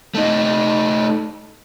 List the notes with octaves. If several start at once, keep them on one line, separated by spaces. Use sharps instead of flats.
A3 D#4